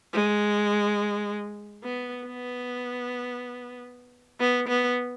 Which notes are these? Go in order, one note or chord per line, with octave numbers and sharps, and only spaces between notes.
G#3
B3
B3
B3
B3